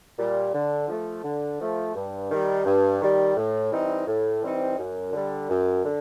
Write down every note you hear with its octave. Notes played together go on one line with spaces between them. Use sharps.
A#2 G3
D3
F3 A3
D3
F3 A3
G2
D#3 G3
G2
D#3 G3
A2
E3 G3 C4 D#4
A2
E3 G3 C4 D#4
F#2
D3 G3
F#2
D3